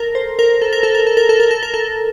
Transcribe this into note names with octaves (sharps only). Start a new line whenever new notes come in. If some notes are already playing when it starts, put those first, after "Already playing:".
Already playing: A4 A#4
C5
A#4
A4
A#4
A4
A#4
A4
A#4
A4
A#4
A4
A#4
A4